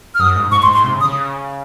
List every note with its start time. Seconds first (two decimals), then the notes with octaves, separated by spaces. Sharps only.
0.15 F6
0.20 F#2 D#6
0.35 G#2
0.51 G#2 C#6
0.62 C6
0.68 G#2
0.73 C6
0.84 C3
0.95 C#3
1.01 D#6
1.05 C#3